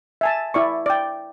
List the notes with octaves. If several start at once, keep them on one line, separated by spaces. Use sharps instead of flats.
E5 G#5 A5
E4 D5 C#6
D5 G5